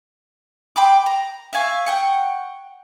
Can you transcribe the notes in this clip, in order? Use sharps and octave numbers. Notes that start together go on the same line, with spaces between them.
G5 B5 C6 D6
A#5
E5 F5 G#5 C#6
F#5 G5 C#6